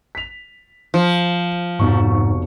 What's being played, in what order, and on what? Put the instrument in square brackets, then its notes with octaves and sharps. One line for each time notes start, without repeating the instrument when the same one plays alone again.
[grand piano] B6 F7
[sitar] F3
[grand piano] F1 B2 C#6 [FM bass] G#2